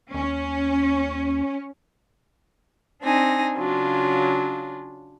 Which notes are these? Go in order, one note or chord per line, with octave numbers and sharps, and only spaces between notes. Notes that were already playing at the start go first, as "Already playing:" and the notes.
D#2 C#4
C4 D4 D#4 G#5 A#6
C#3 F#3 D4 F4